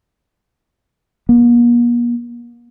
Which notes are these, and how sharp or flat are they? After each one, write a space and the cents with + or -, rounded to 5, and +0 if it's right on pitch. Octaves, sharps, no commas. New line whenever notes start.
A#3 +45